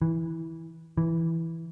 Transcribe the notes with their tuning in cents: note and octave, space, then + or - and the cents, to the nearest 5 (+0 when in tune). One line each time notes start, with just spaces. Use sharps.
E3 -10
E3 -5